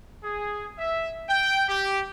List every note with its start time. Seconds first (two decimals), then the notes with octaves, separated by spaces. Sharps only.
0.23 G#4
0.79 E5
1.29 G5
1.69 G4